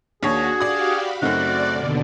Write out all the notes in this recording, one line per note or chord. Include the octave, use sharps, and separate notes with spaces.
D#2 D4 F#4 G#4 C#5
F#4 G4 D5 F5 D#6
B5
F#2 C#3 A3 C4 D#4 F#4 D5
D#2 B2 D3